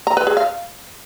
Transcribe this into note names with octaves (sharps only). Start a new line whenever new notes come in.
A#5
B4
G#4
F5